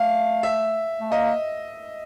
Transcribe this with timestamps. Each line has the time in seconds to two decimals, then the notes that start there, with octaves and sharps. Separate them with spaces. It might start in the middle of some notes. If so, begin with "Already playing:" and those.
Already playing: A3 F5
0.43 E5
1.00 A3
1.11 A#3 D#5